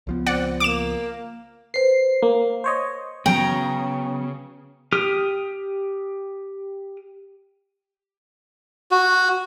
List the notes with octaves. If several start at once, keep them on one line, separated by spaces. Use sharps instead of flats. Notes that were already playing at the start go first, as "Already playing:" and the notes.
C#2 F3 B3
C4 D5 F#5
A#3 D6 E7
B4 C5 C7
A#3
C5 C#5 D#5
C#3 F#3 B3 G5 A#5
G4 D#6 F6
F#4